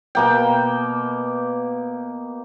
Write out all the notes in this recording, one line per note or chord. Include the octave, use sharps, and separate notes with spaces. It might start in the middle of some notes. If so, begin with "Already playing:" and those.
B2 A#3 G5